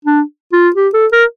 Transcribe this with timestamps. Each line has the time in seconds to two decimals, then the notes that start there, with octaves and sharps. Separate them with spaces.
0.05 D4
0.53 F4
0.76 G4
0.94 A4
1.12 A#4